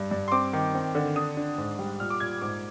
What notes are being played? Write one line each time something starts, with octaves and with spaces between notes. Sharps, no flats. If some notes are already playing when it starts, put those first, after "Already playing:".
Already playing: G2
G2
C6
C4 D6
D#3
C4
D3
D4 D#6
D4
G#2
G3
A#2 F6
D6
A#2 G#6
G#2 D6